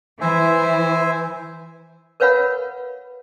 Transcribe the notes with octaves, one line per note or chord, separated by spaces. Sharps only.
E3 C5 E5 G#5
A#4 B4 C#5 F5 F#5 B5